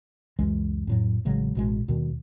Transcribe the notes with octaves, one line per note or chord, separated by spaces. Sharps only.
C#2 F#2 E3 G#3
F2 A2 F#3
A1 C#3 F#3 G#3
A1 B2 G#3
D#2 B2 D#3 G3